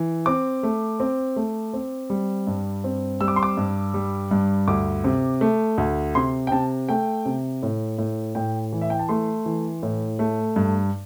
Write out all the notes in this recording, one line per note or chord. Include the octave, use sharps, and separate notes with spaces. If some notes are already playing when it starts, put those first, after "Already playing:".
Already playing: E3
C4 D6
A3
C4
A3
C4
G3
G2
C4
G3 E6
D6
C6
D6
G2
G3
G2
D2 D6
C3
A3
D2
C3 C6
G5
C3 A5
A3 G5
C3
A2
A2
A2 G5
E3
E5
G5
A5
A3 C6
E3
A2
A3
G2